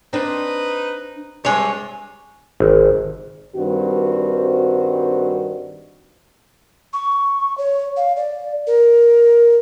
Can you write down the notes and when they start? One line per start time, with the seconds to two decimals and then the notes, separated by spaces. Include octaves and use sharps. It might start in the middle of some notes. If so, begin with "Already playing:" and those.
0.13 C4 D4 D#4 B4
1.45 G2 C3 G#3 C#5
2.60 G#1
3.56 G2 D#3 G3 C4 F#4
6.93 C#6
7.58 C#5
7.97 F5
8.16 D5
8.67 A#4